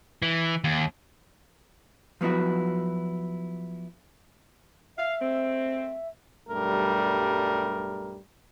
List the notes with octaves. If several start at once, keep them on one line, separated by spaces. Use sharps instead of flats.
E3
D#2
F3 F#3 B3 E4 F#4
E5 F5
G#3 A3 C4
B1 G2 G3 A3 A#4